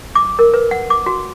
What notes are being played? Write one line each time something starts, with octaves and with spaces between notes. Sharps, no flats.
D6
A#4
B4
F#5
D6
F#4